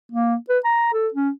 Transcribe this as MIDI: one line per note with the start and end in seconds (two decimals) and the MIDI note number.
0.12 0.35 58
0.49 0.59 71
0.64 0.91 82
0.93 1.09 69
1.14 1.30 61